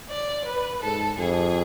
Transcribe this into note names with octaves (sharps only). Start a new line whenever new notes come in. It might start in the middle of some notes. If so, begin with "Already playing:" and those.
D5
B4
G#2 A4
F2 G#4